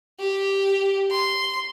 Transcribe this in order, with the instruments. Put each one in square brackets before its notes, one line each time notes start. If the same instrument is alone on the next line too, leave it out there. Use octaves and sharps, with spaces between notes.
[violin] G4
C6